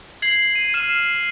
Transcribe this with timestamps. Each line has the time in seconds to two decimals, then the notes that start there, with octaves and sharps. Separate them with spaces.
0.22 G#6 C7 F#7
0.55 D#7
0.74 F6 C7 E7